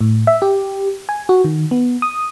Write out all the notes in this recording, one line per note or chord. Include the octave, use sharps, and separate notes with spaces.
A2
E5
G4
G#5
F#4
D#3
B3
D#6